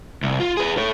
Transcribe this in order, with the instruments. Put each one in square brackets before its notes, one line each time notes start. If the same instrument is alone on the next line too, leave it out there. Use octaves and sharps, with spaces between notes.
[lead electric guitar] C2
F4
G#4 B4
A4 C#5